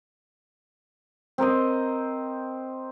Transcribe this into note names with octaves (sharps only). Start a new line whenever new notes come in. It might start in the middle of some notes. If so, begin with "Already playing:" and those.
C4 A#4 C5 D#5